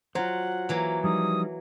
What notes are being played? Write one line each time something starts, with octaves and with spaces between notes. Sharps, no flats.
F#3 F4 C5 F#5
E3 F#3 A#3
F3 G3 D#4 D#6